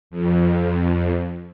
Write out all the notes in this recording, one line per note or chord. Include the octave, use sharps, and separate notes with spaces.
F2